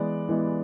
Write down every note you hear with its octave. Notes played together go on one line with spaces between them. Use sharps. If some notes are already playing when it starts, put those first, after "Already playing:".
Already playing: E3 G#3 B3 D5
E3 G#3 B3